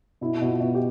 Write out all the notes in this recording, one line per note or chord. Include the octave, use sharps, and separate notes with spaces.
B2 E4
B2
F4
B2
G4